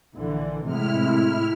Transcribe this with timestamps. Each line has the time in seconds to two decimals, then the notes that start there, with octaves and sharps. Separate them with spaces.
0.16 A#1 D3 E3
0.66 A2 C3 G#3 E4 F6